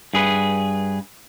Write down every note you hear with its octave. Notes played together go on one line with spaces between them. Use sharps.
G2 G#4 B4